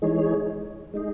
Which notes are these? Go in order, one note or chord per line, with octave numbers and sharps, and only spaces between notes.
E3 G#3 D#4 G#4 C#5
G#3 D#4 G#4